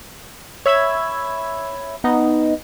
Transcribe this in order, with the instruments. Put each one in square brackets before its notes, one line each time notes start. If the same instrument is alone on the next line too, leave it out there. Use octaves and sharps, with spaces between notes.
[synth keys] C#5 E5 B5 E6 G#6
B3 D#4 D#5